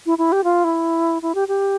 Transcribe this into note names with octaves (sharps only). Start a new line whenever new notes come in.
E4
E4
G4
F4
E4
E4
G4
G4